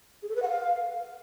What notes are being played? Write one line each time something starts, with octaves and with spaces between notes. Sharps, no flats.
G#4
A4
B4
F#5
F5